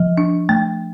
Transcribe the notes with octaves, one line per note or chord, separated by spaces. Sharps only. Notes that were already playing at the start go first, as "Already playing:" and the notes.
Already playing: F3
D4
A3